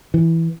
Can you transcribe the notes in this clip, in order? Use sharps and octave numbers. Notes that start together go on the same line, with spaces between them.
E3